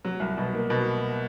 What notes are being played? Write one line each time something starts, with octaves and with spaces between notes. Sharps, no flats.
F#3
C2
B2
A#3
B2